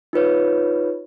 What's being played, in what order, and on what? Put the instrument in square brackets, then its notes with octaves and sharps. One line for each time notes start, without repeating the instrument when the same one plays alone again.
[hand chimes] D#4 F4 B4 C#5